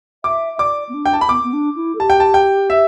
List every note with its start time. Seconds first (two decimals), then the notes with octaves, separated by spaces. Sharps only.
0.24 E5 D6
0.55 E5
0.59 D5 D6
0.89 B3
0.94 D4
1.05 G5
1.13 A5
1.21 B5
1.29 B3 D6
1.43 B3
1.53 D4
1.76 E4
1.95 A4
1.99 G4 A5
2.10 G5
2.20 A5
2.34 G5
2.70 E5